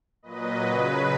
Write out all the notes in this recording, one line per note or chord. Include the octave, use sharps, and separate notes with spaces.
A#2 F#3 B4 D#5
C#3 F#3 B4